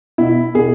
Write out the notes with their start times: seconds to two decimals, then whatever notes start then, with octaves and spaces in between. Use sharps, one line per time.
0.18 B2 E4
0.54 B2 G#4